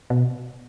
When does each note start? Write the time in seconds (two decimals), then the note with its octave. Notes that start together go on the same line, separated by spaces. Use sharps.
0.10 B2